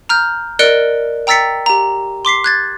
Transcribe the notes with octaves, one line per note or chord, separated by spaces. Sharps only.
A#5 F6 G6
A#4 D5 D#5 F#6 C#7 D7
G5 A#5 E6 A6 B6 C#7
G4 A#5
C6 D6 B6 C7
F#6 G#6 A6